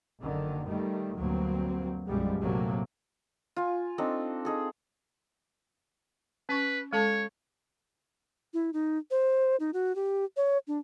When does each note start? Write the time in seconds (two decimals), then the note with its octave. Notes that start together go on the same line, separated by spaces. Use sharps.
0.20 F#1 D3 D#3
0.66 D#3 G3 A3
1.17 D2 G2 F#3 A#3 C4
2.08 B1 F#2 B2 F3 G3 G#3
2.40 A#1 C3 F#3 A3 A#3
3.56 F4 G#5
3.98 C4 D4 D#4 A4
4.45 D#4 G#4 A4
6.49 C#4 B4 C#6
6.93 G#3 A4 C#5 A5
8.54 E4
8.73 D#4
9.11 C5
9.60 D#4
9.73 F#4
9.95 G4
10.37 C#5
10.67 D4